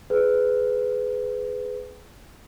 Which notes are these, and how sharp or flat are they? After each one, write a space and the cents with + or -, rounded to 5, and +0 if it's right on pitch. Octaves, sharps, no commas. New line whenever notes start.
G#4 +20 B4 +20